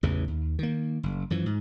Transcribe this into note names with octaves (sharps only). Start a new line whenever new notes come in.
A1 E2 C#3 E3
D#2
D#3 A#3
F#1
F#2 E3 F3
G#2